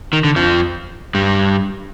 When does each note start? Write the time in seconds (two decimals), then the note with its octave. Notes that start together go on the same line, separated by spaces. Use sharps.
0.13 D#3
0.24 D3
0.36 F2 F3
1.14 G2 G3